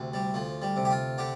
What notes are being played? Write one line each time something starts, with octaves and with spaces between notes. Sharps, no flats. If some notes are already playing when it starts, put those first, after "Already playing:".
Already playing: D2 C3
G3
D2 F3
G3
C3
G4
F4
D3 G4